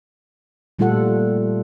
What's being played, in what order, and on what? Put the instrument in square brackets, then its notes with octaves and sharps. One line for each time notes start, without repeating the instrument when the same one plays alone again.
[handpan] A#2 G3 A3 F4 A4 F#5